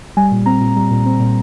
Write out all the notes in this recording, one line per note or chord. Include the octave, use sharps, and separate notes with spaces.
G3 G#5
A#2
C4 A#5
A#2
G3
A#2
C4
A#2